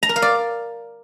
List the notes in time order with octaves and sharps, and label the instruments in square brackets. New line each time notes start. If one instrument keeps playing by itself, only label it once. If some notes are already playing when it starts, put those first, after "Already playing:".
[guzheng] A#5
A#4
F5
D5